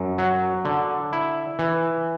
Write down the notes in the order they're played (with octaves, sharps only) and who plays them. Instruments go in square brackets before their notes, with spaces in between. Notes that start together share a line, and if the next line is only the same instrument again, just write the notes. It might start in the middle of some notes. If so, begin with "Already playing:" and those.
Already playing: [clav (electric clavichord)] F#2
F#3
D3
E4
E3